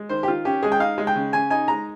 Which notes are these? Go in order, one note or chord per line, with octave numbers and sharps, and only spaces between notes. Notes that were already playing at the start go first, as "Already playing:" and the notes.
Already playing: G#3
D#3 C5
G4
D#3 F4
C#4 G4
G#3 G#4
G5
D#4 F5
G#3
G5
C#3
C#3 G#5
D#4 G#5
G#3 A#5